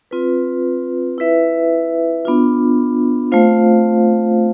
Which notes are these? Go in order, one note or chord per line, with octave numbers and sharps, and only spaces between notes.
C4 F4 B4
E4 B4 E5
B3 D4 F4
A3 C4 F4 C5 F5